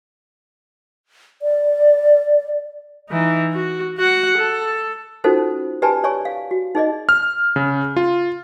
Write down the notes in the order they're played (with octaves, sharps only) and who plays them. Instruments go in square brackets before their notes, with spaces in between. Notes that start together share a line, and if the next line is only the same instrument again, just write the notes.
[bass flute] D5
[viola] E3 D#4
F#4
F#4 F#5
A4
[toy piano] C#4 D#4 F4 F#4 A4 C5
G4 B4 D5 G#5 A5 B5
C#5 D5 G#5 C#6
F5
F#4
D#4 G#4 D5 D#5
[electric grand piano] F6
C#3
F4